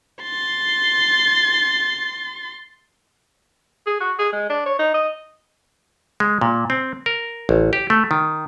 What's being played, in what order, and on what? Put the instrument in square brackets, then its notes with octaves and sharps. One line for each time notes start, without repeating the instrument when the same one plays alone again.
[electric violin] C6 A6
[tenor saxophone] G#4
F#4
G#4
G#3
D4
C#5
D#4
D#5
[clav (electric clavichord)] G#3
A#2
C4
A#4
A1
G4
A3
D#3